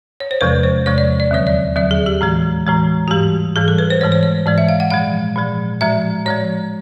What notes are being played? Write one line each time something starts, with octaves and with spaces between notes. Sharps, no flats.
C#5
C5
E2 C3 F3 G#3 B4
C5
E2 C3 F3 G#3 C#5
D5
D5
D#2 D3 F#3 C#5
D5
D#2 D3 F#3 D5
G#4
G4
A2 E3 G#3
A2 E3 G#3
F#4
G#2 E3 G3 G4
G#2 E3 G3 G#4
A4
B4
C5
G#2 E3 G#3 C#5
C5
C#5
G#2 E3 G#3 D5
E5
F5
F#5
A#2 F3 G#3 F5
A#2 F3 G#3
A2 F3 G#3 E5
A2 F3 G#3 C#5